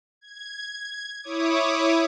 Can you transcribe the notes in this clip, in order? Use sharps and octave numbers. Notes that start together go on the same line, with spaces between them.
G#6
E4 C#5 D6 D#6